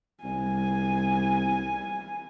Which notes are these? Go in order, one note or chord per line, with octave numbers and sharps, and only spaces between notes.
C2 G#5